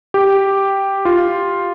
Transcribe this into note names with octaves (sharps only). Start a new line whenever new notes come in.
G4
F4